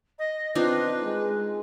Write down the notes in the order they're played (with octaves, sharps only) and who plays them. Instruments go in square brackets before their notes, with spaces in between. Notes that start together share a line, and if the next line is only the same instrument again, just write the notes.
[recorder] D#5
[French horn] C4 [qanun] D4 D#4 F4 [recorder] B4
[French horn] G#3